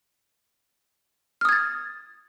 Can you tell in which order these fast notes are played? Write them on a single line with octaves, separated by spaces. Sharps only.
F6 D#6 G#6 A6